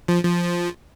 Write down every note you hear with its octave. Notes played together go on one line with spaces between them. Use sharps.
F3
F3